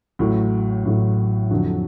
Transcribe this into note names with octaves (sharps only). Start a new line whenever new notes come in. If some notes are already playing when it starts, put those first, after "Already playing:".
A1 A2 F#3
A1 A2 F#3
F2 D3 F#3